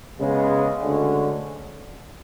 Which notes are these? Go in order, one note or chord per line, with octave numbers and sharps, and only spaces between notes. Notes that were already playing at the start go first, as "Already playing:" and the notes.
C#3 G#3 B3
D2 D3 G#3 C#4